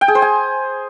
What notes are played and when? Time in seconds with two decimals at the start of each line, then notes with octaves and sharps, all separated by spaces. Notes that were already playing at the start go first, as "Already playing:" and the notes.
0.01 G5
0.08 G#4
0.15 C5
0.22 G#5